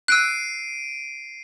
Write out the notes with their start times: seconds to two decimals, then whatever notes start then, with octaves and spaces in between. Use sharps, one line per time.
0.08 E6 F#6 C7 D7 D#7